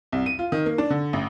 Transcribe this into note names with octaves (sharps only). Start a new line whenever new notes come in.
C2
D#7
F4
D#3
A#3
D4
D3
A1